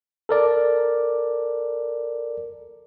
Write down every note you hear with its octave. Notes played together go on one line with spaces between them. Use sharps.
A4 A#4 D5